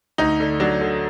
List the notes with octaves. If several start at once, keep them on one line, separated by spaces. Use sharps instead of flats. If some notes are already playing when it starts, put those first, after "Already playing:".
D2 D#4
D3
F#3 D4
D3